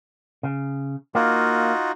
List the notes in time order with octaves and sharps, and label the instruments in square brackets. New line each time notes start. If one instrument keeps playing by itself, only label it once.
[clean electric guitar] C#3
[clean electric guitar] A#3 [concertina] D#4 F4 F#4